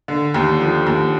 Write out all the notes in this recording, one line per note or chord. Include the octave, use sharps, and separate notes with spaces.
D3
D#2
F3
D#2